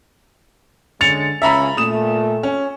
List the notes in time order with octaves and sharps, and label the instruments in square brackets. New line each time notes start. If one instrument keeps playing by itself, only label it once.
[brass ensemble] D3 G#3 C#4 [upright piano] A6 C#7 F7
[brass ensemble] C#2 C#3 C#4 [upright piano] E5 A#5 B5
[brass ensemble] A#2 A3 [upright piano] D#6 E7
[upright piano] C#4